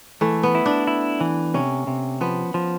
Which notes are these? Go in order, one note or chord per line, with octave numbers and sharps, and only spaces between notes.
E3 A3
B3
E4
D4
E4
E3
C3 C#4
C3
F3 B3
F3